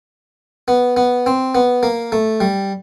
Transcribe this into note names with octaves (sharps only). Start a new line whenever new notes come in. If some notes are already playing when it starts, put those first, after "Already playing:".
B3
B3
C4
B3
A#3
A3
G3